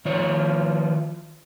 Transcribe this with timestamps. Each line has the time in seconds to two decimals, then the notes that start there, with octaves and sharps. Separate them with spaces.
0.05 D#3 F3 C#5